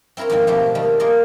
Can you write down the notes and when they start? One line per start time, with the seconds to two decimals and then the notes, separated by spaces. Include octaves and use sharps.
0.17 C4 E4 A#4 C#5 A#5
0.29 F2 G#2 D#3 G#3 C4
0.47 B2 F3 A3 C4 G4
0.75 D#3 G3 A3 C4
1.00 F4 G#4 A#4 D5 D#5 F5